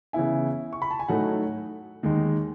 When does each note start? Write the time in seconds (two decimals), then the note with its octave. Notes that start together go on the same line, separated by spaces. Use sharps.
0.13 C#3 E3 B3 E4 G#5
0.73 C#6
0.82 B5
0.91 A5
1.00 G#5
1.09 A2 F#3 A3 D#4 F#5
2.03 D#2 D#3 G#3 D#4